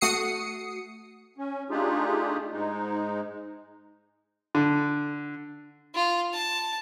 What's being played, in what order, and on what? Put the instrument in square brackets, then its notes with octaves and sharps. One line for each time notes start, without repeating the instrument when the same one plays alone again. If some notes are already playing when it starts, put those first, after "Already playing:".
[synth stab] A3 F#4 D#6 C7 C#7
[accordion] C#4
A3 D4 D#4 F4 G4 G#4
G#2 G#3 D#4
[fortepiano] D3
[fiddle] F4
A5